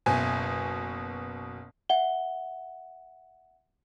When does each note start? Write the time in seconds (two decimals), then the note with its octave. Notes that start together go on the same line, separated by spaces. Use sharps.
0.06 F#1 B2 G#5
1.89 E5 F#5 G7